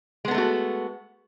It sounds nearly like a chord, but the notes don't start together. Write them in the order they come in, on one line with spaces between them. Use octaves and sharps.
G#3 B3 A4 A3 F#4